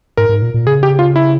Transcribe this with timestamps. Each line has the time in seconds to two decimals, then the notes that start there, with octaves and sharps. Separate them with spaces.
0.17 G#2 A#4
0.29 G#2
0.42 A#2
0.54 A#2
0.67 C#3 G#4
0.83 G4
0.99 F4
1.16 E4